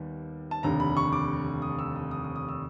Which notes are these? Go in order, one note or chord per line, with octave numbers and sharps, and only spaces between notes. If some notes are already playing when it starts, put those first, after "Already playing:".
Already playing: D#2 D#3 G3 B3
A5
F1 D#2 D3 A#5
B5
C#6
D6
D#6
E6
D#6
D#6
D#6
D#6
E6